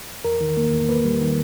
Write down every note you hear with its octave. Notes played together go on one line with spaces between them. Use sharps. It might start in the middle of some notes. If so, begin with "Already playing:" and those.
E2 A#4
D#3
A#3
E2
A#3 B4
G3
D#3